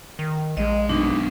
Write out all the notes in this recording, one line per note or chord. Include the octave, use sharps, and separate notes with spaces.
D#3
A#1 G#3 D#5
F#2 B2 D4 D#4